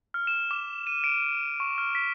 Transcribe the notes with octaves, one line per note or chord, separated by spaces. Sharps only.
F6
E7
D6
D#7
D7
C#6
F6
B6